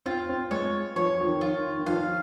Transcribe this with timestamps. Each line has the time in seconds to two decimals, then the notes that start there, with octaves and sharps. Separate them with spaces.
0.06 C4 F4
0.29 C4
0.51 G#3 C#5
0.96 F3 C#5
1.21 F3
1.27 D#3
1.41 F4
1.57 D#3
1.79 D#3
1.86 F3 F5